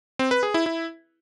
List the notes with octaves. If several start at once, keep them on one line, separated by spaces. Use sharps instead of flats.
C4
B4
G#4
E4
E4